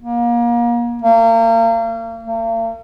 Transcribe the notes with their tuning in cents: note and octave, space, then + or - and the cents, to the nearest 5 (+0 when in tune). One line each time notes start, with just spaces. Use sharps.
A#3 +30
A#3 -35
A#3 -45